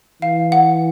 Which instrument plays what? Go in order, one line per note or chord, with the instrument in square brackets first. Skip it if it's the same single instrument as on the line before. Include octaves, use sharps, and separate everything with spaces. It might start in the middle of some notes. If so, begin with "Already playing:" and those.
[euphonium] E3 [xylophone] F5
[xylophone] F#5